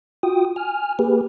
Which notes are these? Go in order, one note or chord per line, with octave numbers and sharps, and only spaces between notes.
F4 F#4 G5 D#6
G#5 F6
A#3 G4 G#4 B4